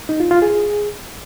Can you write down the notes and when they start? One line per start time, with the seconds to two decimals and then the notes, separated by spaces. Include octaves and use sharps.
0.09 D#4
0.20 F4
0.31 F4
0.42 G#4